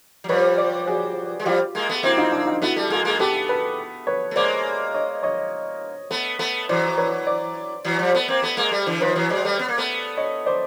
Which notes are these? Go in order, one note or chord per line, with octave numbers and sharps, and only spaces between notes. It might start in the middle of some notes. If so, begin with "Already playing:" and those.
F#3
F3 G3 B4 C#5
C5 D5
F#4 G#4
G#3
F3 G3 F4 G4
G#3 A#3
A3 B3
A#3 C4 E4 F#4
D#4 F4
D4 E4
D#4 F4
A3 B3 E4 F#4
G3 A3 A4
G#3 A#3 F#4 G#4
G#3 A#3
A3 B3 G4 A4
A4 B4
B4 C#5
A3
G#3 A#3 C5 D5
C#5 D#5
C#5 D#5
A3 B3
A3 B3
E3 F#3 C5 D5
B4 C#5
C5 D5
E3 F#3
F3 G3
A3 B3
A#3 C4
A3 B3
G#3 A#3
G3 A3
D3 E3
D#3 F3 B4 C#5
E3 F#3
F#3 G#3 C5 D5
G3 A3
B3
A#3
A3 B3
C#5 D#5
C5 D5